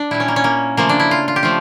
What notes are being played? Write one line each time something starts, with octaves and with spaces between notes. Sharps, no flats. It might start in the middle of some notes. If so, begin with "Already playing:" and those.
Already playing: D4
A#2 G3 E4
C#4
A#3
C#4
A#3
C#3 F3 A3 A#3
D4
E4
F4
F4
G4
F3 A3 F4